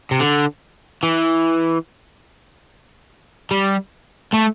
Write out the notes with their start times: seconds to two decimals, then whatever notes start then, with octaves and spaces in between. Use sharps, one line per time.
0.11 C3
0.20 D3
1.03 E3
3.51 G3
4.34 A3